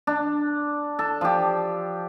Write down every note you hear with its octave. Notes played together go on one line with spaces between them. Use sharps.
D4
A4
F3 G4